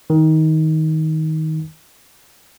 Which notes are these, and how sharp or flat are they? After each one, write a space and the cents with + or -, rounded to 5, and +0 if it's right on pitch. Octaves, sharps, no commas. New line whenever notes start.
D#3 +20